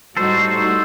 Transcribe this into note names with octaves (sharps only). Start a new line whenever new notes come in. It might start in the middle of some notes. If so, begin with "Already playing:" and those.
A2 G3 D#4 F#4 A4 C5